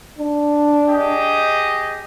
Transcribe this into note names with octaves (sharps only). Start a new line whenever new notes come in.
D4
G4 G#4 D#5